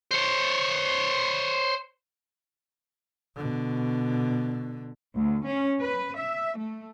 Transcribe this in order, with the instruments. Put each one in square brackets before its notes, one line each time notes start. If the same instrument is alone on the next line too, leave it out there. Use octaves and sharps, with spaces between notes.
[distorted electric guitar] C5 C#5
[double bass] B2 D3
[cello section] D2
C#4
B4
E5
A3